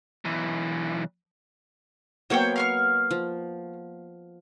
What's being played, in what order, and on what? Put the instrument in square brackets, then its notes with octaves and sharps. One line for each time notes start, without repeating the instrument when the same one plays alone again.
[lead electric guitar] B1 E3
[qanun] F#3 A#3 B3 [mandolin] C5 C#5 G5
[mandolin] F5 C#6 F6
[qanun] F3